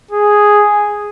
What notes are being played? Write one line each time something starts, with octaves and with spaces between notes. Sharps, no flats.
G#4